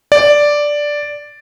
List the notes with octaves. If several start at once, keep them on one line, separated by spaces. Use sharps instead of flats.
D5